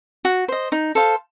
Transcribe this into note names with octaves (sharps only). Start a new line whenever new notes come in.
F#4
C5 D#5
D#4
A4 C5 F5